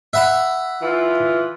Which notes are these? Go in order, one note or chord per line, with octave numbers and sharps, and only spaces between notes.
E5 F#5 B5
E3 F4